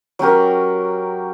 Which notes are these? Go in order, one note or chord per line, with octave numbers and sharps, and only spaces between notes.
F#3 C#4 G4 A#4